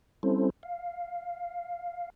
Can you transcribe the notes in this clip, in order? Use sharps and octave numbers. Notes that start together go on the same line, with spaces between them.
G3 C4 C#4 E4 A4 C5
F5